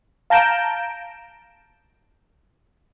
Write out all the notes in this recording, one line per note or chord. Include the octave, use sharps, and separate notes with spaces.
F5 A5 A#5 G6 D7 E7